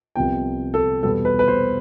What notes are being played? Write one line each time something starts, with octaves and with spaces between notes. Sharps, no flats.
C2 C3 F3 B3 G5
A4
E2 B2 G3 B3 A4
B4
B4
C5